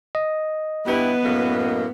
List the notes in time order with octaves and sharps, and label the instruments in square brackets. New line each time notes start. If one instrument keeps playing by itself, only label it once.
[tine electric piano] D#5
[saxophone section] G2 E4 G4 [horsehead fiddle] B3 [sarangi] B4
[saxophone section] F#2 A2 A#3